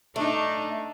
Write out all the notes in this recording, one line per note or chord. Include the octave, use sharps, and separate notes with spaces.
A3 D4 D#4